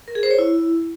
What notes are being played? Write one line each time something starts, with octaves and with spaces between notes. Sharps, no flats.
A#4
G#4
C5
C#5
E4